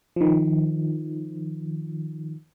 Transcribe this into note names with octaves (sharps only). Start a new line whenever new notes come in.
D#3 F3